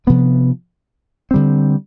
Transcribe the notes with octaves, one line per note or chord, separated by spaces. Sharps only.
C3 F3 B3 D4
D3 G3 C4